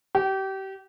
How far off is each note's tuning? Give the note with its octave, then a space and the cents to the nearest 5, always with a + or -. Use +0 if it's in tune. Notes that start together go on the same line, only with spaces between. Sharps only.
G4 -30